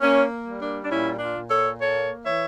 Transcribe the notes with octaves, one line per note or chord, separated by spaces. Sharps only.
A#3 C#4
G3
A#3 D4
D4
A#2 C#4 E4
D4 F4
A#2
A4 C#5
A#3 A4 C#5
E3 C#5 E5